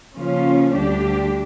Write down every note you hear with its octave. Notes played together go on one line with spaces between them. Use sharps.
C#3 F3 A#3 C#4 F4
D2 D3 G3 D4 G4